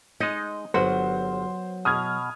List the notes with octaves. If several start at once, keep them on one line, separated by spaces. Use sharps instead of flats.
G#3 D#4 D#5
G1 F#3 B3 F#4 C5 F#5
B2 D#6 F6 G#6